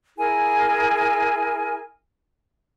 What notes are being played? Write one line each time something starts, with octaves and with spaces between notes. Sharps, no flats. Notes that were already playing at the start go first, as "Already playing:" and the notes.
E4 G#4 A#4 G#5